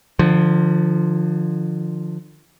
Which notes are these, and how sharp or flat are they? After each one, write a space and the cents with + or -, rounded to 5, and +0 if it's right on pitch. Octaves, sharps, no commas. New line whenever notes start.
D3 +35 F3 +0